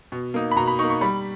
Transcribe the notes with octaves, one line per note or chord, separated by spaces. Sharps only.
B2
A#3 D#4
B5
B2 A#5
B5
A#3 D#4 C#6
C#6
G3 B5